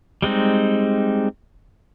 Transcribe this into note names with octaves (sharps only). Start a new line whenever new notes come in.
G3 G#3 C4 D#4